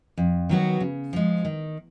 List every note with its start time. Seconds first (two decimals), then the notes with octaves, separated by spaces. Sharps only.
0.17 F2
0.49 D#3 F#3 B3 F#4
0.80 C#3
1.13 F3 G#3
1.45 D#3